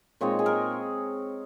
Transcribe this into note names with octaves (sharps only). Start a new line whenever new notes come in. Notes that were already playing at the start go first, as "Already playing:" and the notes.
A#2 G#3 C4 D#4 C#5
G#4
A#4